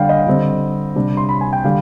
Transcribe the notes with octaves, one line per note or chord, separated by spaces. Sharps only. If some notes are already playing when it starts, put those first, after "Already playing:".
Already playing: D3 G3 D4 F5 G5
D#5
D3 G3 C4
C3 G3 D4
C6
B5
G#5
G5
D3 G3 F5